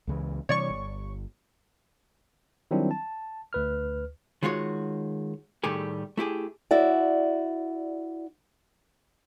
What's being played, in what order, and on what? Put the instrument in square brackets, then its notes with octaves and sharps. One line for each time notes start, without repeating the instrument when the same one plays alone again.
[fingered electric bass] C#2 C#3 E3
[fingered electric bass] C3 E3 G3 [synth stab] C#5 D5 C#6
[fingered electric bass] G1
[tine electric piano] D#3 F#3 G3 C4 D4 E4
A5
D2 B4 F6
[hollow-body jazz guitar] D#3 G#3 F4 F#4 C#5
A2 D#3 G3 A3 G4 G#4
A3 E4 G4 G#4
[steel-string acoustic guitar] E4 F#4 D5